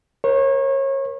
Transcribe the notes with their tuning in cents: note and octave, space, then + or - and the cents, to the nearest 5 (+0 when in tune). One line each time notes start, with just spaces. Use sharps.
A#4 +25 C#5 -30